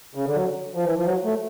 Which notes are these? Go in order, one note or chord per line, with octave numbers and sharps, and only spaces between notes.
C#3
D3
F#3
F3
E3
F3
F#3
A3